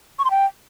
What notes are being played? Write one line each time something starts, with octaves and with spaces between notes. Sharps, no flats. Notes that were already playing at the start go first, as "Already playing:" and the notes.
C#6
C6
G5